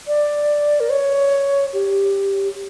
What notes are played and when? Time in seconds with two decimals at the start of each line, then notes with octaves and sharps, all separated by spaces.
0.07 D5
0.80 A#4
0.91 C#5
1.73 G4